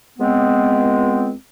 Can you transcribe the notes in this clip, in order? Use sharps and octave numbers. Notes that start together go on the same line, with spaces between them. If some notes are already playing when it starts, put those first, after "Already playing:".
C#2 G#3 B3 C4